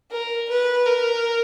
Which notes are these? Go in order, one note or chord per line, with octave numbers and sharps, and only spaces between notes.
A#4
B4
A#4